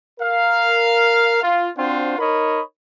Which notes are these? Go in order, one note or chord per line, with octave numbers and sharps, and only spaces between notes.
A#4 F5
F4
C4 D4 F4 F#4 C5
D#4 A#4 C#5 D#5 B5